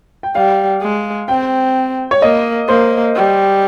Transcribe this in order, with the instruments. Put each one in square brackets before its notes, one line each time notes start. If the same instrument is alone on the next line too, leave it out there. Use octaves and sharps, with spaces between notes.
[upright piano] G5
[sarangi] G3 [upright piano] F5
[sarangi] G#3
[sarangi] C4 [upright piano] G5
[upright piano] C#5
[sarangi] A#3 [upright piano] D#5
[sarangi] A#3 [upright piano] C5
[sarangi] G3